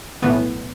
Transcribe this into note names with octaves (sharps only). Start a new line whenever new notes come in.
B1 A2 E3 A3 B3 B4